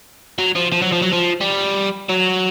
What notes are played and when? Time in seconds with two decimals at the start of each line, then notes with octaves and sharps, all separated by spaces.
0.39 F#3
0.56 F3
0.73 F3
0.82 F#3
0.93 F3
1.02 F#3
1.13 F3
1.41 G3
2.09 F#3